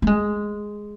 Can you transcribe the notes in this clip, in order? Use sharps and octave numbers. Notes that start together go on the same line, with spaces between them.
A3
G#3